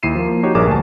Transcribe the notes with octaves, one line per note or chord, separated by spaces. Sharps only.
D#2 E4 C7 D#7 E7
F3 A#3
D#4 F#4 G4 C#5
A#1 G2 G#4 A#4 D6 E7
D2 G#5 A5